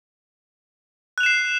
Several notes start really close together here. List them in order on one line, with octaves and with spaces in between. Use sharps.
F#6 F7 E7 C7